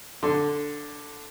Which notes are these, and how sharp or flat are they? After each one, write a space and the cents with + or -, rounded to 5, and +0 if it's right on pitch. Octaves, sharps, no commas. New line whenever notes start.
D3 +0 C6 +0